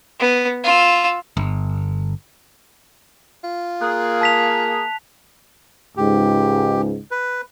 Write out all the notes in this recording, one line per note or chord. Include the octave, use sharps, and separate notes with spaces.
B3
F4 E6
G1
F4
A#3 G#4 F#6
A5 B6 F7
C#2 G#2 G4
B4